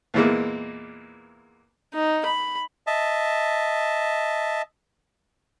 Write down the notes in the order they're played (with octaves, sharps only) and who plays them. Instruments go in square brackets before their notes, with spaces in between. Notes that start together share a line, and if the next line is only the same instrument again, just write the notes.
[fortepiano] E2 A#2 E3 G#3 A#3
[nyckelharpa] D#4
B5
[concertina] D#5 E5 A5